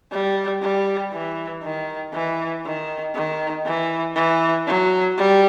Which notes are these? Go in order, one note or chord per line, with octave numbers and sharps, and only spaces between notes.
G3
G3
E3
D#3
E3
D#3
D#3
E3
E3
F#3
G3